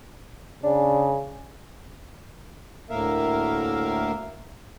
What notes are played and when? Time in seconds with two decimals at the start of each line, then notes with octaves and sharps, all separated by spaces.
0.63 C#3 D4
2.90 D2 A2 A#3 A#4 E5 F5